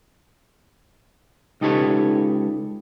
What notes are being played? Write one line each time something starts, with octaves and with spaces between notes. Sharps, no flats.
C#2 D#4 G4 A4 B4 C#5